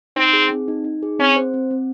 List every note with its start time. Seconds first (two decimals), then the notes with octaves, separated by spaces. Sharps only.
0.16 C4 D#4
0.33 G#4
0.50 C4
0.68 D#4
0.84 D#4
1.03 G#4
1.19 C4 C#4
1.36 C5
1.54 C4
1.71 C4